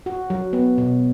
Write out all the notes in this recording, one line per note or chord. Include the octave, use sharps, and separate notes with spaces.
F#4
F#3
B3
B2